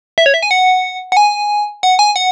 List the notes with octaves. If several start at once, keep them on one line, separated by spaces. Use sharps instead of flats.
E5
C#5
E5
G#5
F#5
F#5
G#5
F#5
G#5
F#5